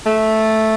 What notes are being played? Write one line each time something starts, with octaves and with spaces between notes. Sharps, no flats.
A3